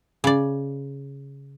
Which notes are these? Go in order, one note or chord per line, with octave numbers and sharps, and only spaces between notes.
C#3 D5